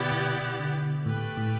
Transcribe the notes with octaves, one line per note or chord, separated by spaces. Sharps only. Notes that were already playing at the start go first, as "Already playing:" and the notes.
Already playing: B2 D3 B3 E4 G4 D5
B2
D3
A2 A3 G4 B4
A2